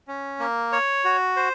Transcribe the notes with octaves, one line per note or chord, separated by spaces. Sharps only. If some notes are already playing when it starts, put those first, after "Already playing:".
C#4
A#3
C#5
F#4
C5